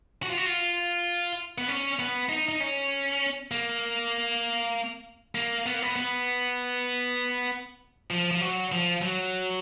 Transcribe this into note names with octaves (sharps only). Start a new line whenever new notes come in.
F#4
F4
F#4
F4
B3
C#4
B3
D#4
D#4
C#4
A#3
A#3
B3
A#3
B3
B3
F3
F3
F#3
F3
F#3